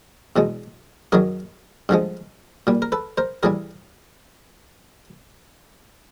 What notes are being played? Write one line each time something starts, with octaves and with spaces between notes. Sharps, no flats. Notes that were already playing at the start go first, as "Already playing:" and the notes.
E2 B2 G#3
F#2 D#3 F#3 G#4 A#4
G2 D3 F3 G#3
A#2 G3
A#4
A4 B4
A#4 C5
A2 E3 G3 G#4 A#4